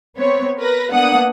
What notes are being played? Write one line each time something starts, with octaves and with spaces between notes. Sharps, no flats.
B3 C4 C#5
A#4 B4 A#6
A#3 B3 D4 F#5 D#6